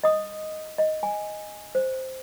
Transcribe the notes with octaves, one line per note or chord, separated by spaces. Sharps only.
D#5 D#6
D#5
G#5
C5